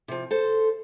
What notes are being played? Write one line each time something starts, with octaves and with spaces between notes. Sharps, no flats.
C3 F3
A4 C5